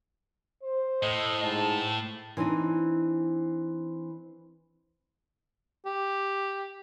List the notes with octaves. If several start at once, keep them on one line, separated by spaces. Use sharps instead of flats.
C5
A2 D#5
G#2 A5
E3 C4 D4 D#4
G4